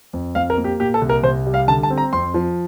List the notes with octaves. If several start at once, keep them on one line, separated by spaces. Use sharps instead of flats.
F2
F2 F5
A#4
A#3
G4
A#2 G4
A4
C2
A#4
C2 C5
G3
F5
D3 A5
A5
C4
A#5
F2 C6
F3